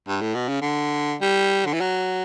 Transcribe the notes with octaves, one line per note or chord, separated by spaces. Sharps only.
G2
A2
B2
C#3
D3
G3
D3
E3
F#3